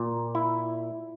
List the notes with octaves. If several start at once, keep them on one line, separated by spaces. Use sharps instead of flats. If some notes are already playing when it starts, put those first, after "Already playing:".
Already playing: A#2
E4